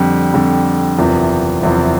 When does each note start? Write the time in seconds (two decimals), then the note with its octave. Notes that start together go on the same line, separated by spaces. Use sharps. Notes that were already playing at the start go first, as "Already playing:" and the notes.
Already playing: F2 D3 G3
0.34 F2 D3 G3
0.98 F#1 E2 C3 F3
1.62 F#1 E2 C3 F3